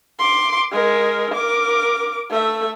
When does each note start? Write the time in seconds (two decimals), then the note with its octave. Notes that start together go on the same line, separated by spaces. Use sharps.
0.19 C6 D6
0.72 G#3 A#4
1.35 A#4 D6
2.30 A3 E5